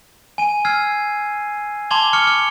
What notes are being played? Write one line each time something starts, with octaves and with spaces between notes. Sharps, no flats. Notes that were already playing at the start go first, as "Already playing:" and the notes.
G#5 D#7
E6 F6 G#6 C7
A5 C6 D6 G#6 F7 G7
C#6 D6 F6 C#7
F6